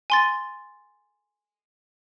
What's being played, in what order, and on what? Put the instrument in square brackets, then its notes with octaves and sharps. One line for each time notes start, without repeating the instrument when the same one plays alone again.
[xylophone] G#5 C6 A6